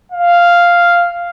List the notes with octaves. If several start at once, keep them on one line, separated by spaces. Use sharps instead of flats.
F5